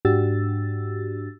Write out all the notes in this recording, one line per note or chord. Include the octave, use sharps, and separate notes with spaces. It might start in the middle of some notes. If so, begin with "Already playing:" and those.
G#2 D4 F#4 G4 E6 A6